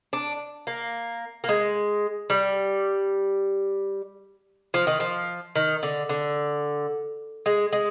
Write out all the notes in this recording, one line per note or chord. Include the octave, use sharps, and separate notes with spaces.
D4
A#3
A#3
G#3
G3
F3
D#3
F3
D#3
D3
D3
G#3
G#3